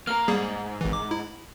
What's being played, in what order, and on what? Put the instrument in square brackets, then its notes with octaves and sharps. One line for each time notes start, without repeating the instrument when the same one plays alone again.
[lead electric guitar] A#3 A#4 [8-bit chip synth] F6
[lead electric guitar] G#2 [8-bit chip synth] G3 A#3 G#4
[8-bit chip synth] G#1 E3
D6
E4